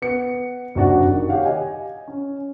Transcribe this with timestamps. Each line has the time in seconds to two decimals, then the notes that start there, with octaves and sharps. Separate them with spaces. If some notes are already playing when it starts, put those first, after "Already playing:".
0.02 B3 C#7
0.75 F#1 C3 D4 F#4 D5
1.11 D#3
1.29 G4 C#5 F5 F#5
1.45 D#5 G#5
2.08 C#4